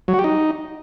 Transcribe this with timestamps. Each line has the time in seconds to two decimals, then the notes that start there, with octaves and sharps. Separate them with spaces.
0.08 F#3
0.14 F#4
0.19 G4
0.24 D#4